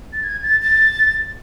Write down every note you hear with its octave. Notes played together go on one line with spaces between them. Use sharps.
A6
G#6
A6
A6